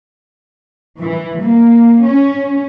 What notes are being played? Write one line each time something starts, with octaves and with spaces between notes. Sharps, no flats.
E3
A#3
C#4